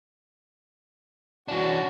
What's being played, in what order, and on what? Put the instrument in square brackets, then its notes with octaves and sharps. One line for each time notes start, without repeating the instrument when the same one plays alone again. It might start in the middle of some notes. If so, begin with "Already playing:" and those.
[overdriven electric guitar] E3 D4 [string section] C#4 F#4